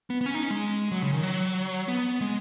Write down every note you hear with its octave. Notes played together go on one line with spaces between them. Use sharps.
B3
B3
C#4
D#4
C#4
G#3
F#3
C#3
D#3
F#3
B3
G#3